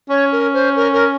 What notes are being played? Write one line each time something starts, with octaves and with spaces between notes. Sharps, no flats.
C#4 C#5
A#4
C5
A#4
A#4